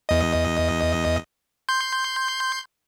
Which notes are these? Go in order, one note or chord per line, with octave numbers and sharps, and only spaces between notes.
E2 D#5
C6 G6